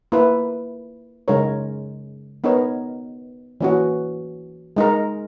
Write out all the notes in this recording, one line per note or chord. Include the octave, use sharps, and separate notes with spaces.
A#3 E4 B4
C#3 G#3 D#4 A#4 C#5
B3 D#4 A#4 C#5
E3 A#3 C#4 F#4
G#3 D#4 A#4